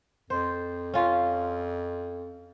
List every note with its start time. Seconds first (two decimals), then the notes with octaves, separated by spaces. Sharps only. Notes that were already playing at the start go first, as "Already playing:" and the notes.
0.30 F2 C5
0.94 C#4 F4